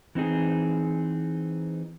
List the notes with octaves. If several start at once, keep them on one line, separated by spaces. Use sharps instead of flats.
E3 C4 D#4 G#4